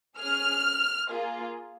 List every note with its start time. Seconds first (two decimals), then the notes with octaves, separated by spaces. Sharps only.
0.18 C#4 G#4 F6
1.09 A#3 F4 G#4